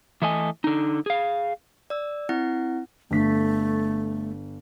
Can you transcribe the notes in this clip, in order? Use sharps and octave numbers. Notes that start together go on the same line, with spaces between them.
E3 A3 D#5 G#5
D3 D#4
G#4 F5
D5 E6
C4 E4 F#5
G1 A3 B6